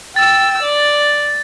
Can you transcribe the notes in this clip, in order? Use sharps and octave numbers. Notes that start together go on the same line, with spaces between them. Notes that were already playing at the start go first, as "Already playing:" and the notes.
G5 E6 A6
D5